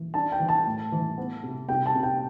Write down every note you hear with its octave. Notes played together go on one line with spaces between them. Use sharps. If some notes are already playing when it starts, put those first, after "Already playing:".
Already playing: E3
D4 A5
G5
E3
A5
A2
E3
B3
C3
C3 G5
A5
C3
G5